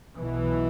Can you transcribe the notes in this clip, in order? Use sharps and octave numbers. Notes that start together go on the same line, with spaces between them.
B1 B2 E3